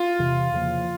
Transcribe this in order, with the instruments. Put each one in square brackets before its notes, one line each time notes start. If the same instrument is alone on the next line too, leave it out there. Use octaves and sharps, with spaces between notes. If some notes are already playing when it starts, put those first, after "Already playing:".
Already playing: [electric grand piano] F4
[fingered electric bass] E2 C3 E3
E2 C#3 F3 A#3